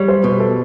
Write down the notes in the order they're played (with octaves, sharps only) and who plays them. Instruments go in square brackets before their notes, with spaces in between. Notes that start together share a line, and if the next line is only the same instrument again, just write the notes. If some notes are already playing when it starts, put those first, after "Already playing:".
Already playing: [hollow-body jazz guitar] G3 [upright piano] C#5 D5
[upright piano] C5
[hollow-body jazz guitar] B2 [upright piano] B4
[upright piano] A4